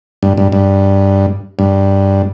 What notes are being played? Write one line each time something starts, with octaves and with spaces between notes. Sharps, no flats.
G2
G2
G2
G2